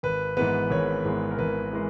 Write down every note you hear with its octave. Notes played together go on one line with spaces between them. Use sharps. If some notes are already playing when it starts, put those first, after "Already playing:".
G#1 B4
G#2 E3 G#3 B3 B4
G#1 C#5
G#2 E3 G#3 B3
A#4
G#1 B4
E3 G#3